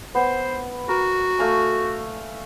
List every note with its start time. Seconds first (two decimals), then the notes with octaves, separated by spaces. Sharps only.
0.15 B3 C5
0.89 F#4 A#4
1.39 A3 F5 G#5